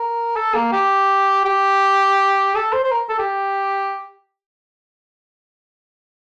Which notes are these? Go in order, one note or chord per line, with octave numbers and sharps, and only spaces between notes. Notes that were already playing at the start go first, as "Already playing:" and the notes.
Already playing: A#4
A4
A#3
G4
G4
A4
C5
C5
A#4
A4
G4